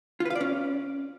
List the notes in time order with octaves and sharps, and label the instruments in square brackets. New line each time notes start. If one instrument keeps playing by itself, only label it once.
[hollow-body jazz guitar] F4
B4
F5
D5
C#4